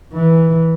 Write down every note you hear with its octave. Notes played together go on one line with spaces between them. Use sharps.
E3